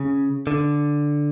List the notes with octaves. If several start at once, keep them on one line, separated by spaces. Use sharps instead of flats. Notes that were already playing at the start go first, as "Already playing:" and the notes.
Already playing: C#3
D3